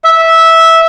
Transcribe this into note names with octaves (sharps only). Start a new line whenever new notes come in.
E5